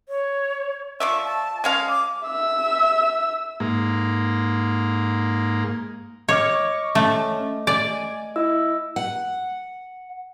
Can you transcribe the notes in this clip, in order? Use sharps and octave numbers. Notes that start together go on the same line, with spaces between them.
C#5
F3 D5 E5 C#6
A5
G#3 C#4 F5
D6
E5 E6
G#2 A#3
C#5 D#5 C#6 D6 F6
A3 C#4
D5 G#5
E4 D#5 E6
F#5